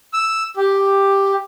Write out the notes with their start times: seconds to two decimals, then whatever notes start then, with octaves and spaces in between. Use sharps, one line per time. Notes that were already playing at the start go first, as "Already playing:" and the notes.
0.13 E6
0.57 G4